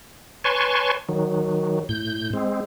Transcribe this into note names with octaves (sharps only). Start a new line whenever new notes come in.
B4 C#5 G#5 A5 C6 C#6
D#3 F#3
A2 G6
G#3 C4